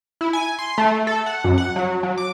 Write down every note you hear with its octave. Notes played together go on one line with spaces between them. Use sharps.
E4
G#5
C6
A3
A4
F#5
F#2
F#5
F#3
F#3
D6